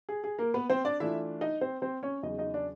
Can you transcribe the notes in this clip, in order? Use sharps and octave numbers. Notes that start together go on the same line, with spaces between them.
G#4
G#4
A#3 A#4
B3 B4
C4 C5
D4 D5
E3 A3 D4 E4 F4 E5
D#4 D#5
C4 C5
C4 C5
C#4 C#5
E2 C#3 F#3 D#4 D#5
D#4 D#5
D4 D5